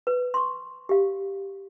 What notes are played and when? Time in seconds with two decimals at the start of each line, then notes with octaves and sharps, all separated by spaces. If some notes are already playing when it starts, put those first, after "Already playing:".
0.07 B4
0.34 C6 C#6
0.89 G4 F5